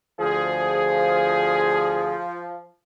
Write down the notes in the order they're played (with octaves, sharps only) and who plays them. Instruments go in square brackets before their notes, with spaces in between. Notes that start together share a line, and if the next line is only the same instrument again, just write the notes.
[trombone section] D2 G#4 [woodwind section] F3